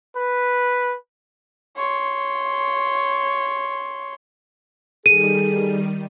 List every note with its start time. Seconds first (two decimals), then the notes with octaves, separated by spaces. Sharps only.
0.16 B4
1.77 C#5 C6
5.06 D#3 G3 G#4 A4 D#7